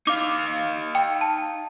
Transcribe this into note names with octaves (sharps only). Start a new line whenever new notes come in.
D#4 F5 D6
G5
A5